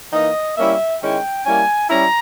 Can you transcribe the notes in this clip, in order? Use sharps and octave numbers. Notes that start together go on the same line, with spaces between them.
E3 A#3 D#4 D#5
G3 A#3 C#4 E4 E5
D#3 G#3 C#4 E4 G5
G3 A#3 C#4 E4 G#5
G3 C#4 E4 A#5